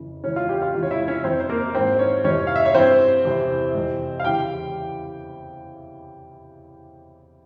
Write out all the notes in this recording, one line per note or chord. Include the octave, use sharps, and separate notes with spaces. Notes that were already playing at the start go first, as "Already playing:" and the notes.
Already playing: F2 C#3 E3
E2 C#3 E3 C#4 C#5
F4 F5
G4 G5
F4 F5
E2 C3 E3 F4 F5
C#5
E4 E5
C#4 C#5
F2 E3 C4 C5
C5
A#3 A#4
G#2 E3 C4 C5
C#4 C#5
F2 C3 E3 C#4 C#5
F5
E5
C#5
G2 E3 C4 C5
E2 C3 E3
F2 C3 E3
F5
E2 C#3 E3 G4 G5